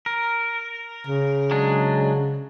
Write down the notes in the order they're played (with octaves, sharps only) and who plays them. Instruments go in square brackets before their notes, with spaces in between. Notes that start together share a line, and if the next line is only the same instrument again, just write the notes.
[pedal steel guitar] A#4
[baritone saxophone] C#3
[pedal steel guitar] F#3 G#3 D4